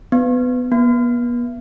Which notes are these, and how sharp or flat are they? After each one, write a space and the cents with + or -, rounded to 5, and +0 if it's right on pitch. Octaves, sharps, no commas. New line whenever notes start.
B3 +20
B3 -40